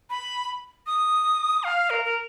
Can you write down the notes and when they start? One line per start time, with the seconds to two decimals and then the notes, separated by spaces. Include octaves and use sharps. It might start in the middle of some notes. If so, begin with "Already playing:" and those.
0.10 B5
0.86 D#6
1.64 F5
1.90 A#4
2.05 A#4